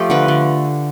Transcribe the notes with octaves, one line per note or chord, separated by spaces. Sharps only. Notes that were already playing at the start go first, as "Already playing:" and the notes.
Already playing: F3 A3 F4 G4
D3 B4
D3